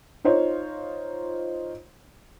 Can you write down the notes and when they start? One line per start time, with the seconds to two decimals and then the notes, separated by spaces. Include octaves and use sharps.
0.24 D#4 F4 C5 C#5